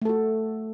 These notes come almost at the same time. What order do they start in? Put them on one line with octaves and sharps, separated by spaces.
A3 A4 F#4